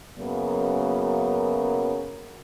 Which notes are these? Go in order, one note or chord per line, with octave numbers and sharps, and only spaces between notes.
F#2 C#3 F#3 A#3 B3